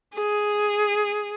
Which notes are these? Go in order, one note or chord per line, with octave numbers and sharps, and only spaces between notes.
G#4